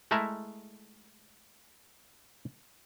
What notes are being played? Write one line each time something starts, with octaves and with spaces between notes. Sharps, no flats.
G#3 A3 E4 G#4 A#4 E5